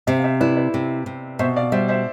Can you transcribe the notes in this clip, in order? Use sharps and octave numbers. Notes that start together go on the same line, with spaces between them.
C3 C5 E5
F5
C5 E5
E4 B4 D5
B4 D5
C3
C3
B2 C5 E5
D5 F5
G3 C5 E5
C5 E5